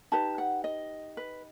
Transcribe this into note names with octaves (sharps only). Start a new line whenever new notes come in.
D#4 G4 B4 A5
F#5
D#5
B4